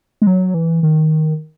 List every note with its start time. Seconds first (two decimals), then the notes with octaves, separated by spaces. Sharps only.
0.22 G#3
0.27 F#3
0.54 E3
0.83 D#3